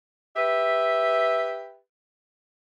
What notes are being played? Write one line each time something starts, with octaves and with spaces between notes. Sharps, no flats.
G4 B4 E5